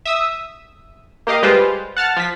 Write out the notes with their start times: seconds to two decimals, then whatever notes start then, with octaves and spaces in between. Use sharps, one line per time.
0.05 E5 D#6 E6
1.27 A#3 G4 D#5 F5
1.43 G3 G#3 F4 G4 B4 C5
1.97 F#5 A5 F6 A6
2.17 F3 B6